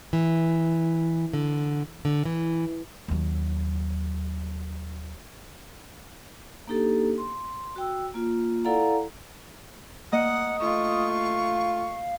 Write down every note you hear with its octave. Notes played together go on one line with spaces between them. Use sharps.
E3
D3
D3
E3
D#2 F#3
A#3 D4 D#4 G4 A4
C6
F#4 G5 E6
A#3 F4
E4 A4 D5 F5 F#5 A#5
A#3 D#5 F#5 D#6
A3 F4 C#6
F5